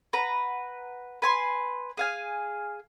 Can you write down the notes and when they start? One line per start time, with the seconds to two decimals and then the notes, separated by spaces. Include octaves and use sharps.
0.13 B4 F#5 A#5
1.22 B4 G#5 C6
1.97 G#4 F5 G#5